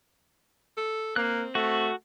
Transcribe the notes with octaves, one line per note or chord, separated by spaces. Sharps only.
A4
A#3 C4 F#6
A3 F#4